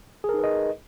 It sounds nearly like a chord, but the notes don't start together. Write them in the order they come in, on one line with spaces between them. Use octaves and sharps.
G#4 A#4 D#4 B4 D#5